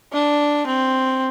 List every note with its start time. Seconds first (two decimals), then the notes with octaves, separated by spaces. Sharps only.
0.13 D4
0.66 C4